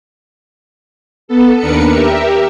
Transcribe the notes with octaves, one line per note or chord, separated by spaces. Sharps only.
B3 A4
D#2 D4 A#4 B4 C#7
G4 A#4 E5